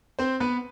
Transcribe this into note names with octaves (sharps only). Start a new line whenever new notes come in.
C4 C5
B3 B4